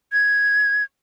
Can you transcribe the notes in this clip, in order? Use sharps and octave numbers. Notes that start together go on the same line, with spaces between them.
G#6